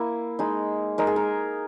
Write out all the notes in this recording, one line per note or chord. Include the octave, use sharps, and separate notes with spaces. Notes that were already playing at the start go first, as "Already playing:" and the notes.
Already playing: A#3 E4
G#3 D#4
G#3 D#4 A#4
G#4
A#4